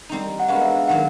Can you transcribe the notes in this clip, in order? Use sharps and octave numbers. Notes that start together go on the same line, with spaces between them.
G3 C4 D#4
F#5
G#3 B3 D4 F#4 A#4 F5
E5
F5
D#3 F#3 F#5